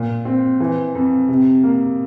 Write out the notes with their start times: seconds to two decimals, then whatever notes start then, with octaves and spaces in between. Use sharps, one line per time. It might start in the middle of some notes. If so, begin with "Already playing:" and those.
Already playing: A#2
0.25 C4
0.60 E3
0.95 F2
1.28 C3
1.63 A#3